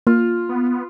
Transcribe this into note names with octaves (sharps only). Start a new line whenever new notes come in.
A#3 F4
B3